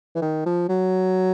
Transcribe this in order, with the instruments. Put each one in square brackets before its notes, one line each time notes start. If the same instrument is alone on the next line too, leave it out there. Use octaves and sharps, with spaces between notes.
[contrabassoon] E3
D#3
F3
F#3